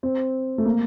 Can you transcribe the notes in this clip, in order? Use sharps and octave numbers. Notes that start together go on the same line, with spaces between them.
C4
A3
A#3